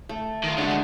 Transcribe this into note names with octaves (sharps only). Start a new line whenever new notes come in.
A3
D#3 F4
D3 G#3 A3 F#4
G#5